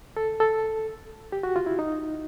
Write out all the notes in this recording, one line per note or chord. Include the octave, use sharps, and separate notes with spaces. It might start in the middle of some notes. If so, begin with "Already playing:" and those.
A4
A4
G4
F#4
F4
E4
D#4